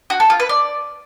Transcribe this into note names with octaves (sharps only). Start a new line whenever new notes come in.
F#4
A4
F4
B4
D5